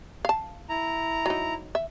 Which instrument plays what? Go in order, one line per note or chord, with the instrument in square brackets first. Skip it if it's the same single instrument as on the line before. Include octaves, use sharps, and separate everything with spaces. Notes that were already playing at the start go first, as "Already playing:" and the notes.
[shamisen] F5 A5
[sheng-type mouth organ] E4 A#5
[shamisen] F#3 D#4
E5